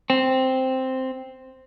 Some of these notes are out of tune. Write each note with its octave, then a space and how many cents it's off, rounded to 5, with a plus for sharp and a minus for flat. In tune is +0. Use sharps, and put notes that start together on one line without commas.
C4 +0